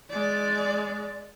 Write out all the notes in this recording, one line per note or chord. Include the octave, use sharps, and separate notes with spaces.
G#3 D5